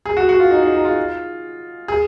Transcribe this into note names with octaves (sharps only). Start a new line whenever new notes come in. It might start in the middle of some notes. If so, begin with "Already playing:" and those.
G#4
F#4
F#4
F4
D#4
D#4
D#4
F4
G#4